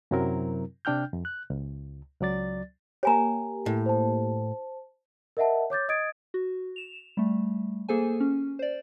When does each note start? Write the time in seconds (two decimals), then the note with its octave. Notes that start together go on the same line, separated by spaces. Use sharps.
0.11 F#2 C3 F#3 C4 E4 A#4
0.85 C3 D4 G5 F6 G6
1.13 F2
1.25 F#6
1.50 C#2
2.21 C#2 F#3 D5 A6
3.03 A#3 G4 C#5 G#5 A#5
3.66 A2
3.86 C5 A5
5.37 A#4 D#5 E5 F#5 A5
5.70 C#5 D6 G6 A6
5.89 D#5 D#6 G#6 A6 D7
6.34 F#4
6.76 E7 F7
7.17 G3 A3
7.89 A#3 G#4 A4 C5 G#5
8.20 C#4
8.59 C5 D5